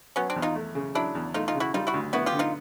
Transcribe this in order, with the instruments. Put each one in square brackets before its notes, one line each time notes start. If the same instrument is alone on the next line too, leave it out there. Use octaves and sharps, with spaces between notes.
[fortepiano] F#3 [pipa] B3 C#4
[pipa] C4 D4
[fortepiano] E2
[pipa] D#4 F4
[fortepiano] A3
C#3
[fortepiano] F#3 [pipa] D4 E4
[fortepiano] E2
[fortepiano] A3 [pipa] D#4 F4
[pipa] D#4 F4
[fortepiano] C#3
[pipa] E4 F#4
[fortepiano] G3 [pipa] D#4 F4
[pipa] E4 F#4
[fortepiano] D2
[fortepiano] B3 [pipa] E4 F#4
[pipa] F4 G4
[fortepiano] D3
[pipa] D#4 F4